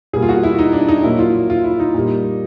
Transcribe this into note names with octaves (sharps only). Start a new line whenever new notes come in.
B2 G3 A#3 G#4
F4
F#4
E4
D#4
D4
D#4
A#2 F#3 A#3 E4
F4
F4
E4
D#4
A#2 G3 A#3